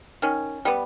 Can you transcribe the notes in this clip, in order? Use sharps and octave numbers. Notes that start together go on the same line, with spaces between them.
D#3 C#4
G3 B3